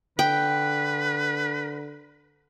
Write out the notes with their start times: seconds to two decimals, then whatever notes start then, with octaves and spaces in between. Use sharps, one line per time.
0.19 D3 B4 G5